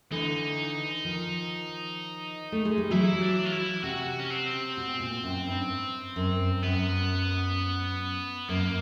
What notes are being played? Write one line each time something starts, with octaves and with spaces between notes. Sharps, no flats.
D3 E3 D#4
D#3 F3
A3
G#3
G3
E3 F#3 E4
D4
F4
E4
C3 F#4
C#4
C4
B2
A#2
F#2
G2
F#2
F#2 B3
F#2 A#3